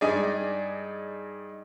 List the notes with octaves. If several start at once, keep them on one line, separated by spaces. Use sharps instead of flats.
G2 D#4 G#4 D5